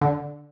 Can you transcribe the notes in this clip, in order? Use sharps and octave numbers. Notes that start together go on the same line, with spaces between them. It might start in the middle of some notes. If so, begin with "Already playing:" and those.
D3